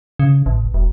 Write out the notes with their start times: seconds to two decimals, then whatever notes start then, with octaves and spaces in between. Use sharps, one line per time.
0.19 C#3
0.46 A1
0.74 E1